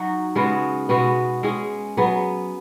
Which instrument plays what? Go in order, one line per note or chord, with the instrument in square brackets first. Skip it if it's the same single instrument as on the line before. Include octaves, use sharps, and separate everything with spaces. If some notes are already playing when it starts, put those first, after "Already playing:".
Already playing: [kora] F#3 D#4 F#4
C#3 G#3 B3 F#4
B2 G#3 B3 F#4
G#3 C#4 G#4
F#3 B3 G#4